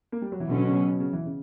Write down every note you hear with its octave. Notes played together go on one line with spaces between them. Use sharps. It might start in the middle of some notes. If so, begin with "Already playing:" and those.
A#3
G3
F#3
E3
B2 D3 F#3 C#4
D3
C#3
B2
C#3
E3
C#3